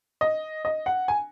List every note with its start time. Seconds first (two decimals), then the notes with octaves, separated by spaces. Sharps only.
0.21 D#5
0.65 D#5
0.86 F#5
1.08 G#5